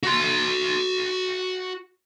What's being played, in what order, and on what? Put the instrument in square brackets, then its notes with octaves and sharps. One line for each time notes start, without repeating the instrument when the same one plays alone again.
[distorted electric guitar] F#4 C6